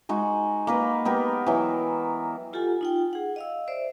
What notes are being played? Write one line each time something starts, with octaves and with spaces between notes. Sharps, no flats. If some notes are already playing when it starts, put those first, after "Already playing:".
G#3 D#4 F#4
A#3 A#4 B4
B3 G4 A#4 B4
E3 F#3
F4 G4 A4 F#5 G#5
D#4 F4 G5
G#4 F#5
D#5 F5 E6
C5 D5 E5